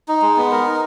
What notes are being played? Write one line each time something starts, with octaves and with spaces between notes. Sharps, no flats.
D#4
G#3
B3
A#4
D#4